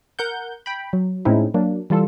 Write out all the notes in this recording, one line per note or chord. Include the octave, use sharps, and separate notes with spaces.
A#4 F#5 G6
G5 B5
F#3
A2 G#3 C4 C#4 D#4 E4
F#3 A#3 D4
E3 G3 F4 A4